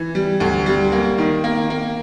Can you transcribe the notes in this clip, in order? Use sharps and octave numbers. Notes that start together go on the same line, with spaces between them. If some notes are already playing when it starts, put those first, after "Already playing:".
Already playing: E3
G3
D2
G3
A#3
D#3
A#3
A#3